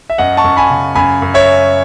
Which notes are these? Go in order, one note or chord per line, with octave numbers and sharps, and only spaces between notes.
E5
F#2 D#5 F#5
A5 C#6
F#2
G#5 B5
C#3
F#2 G#5 B5
F#2
C#5 E5